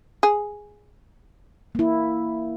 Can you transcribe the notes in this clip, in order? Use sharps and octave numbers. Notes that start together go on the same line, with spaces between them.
G#4
A#3 E4